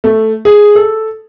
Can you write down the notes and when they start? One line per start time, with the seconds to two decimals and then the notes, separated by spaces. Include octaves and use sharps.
0.04 A3
0.45 G#4
0.76 A4